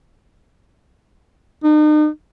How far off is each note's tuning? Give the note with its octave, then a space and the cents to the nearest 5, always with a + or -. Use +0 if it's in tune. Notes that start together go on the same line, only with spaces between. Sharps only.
D#4 -40